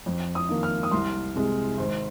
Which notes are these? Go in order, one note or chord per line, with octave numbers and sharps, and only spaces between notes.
F2
D#6
D#3 A#3
F6
D#6
C2 C6
C3 G#3
G#1 C5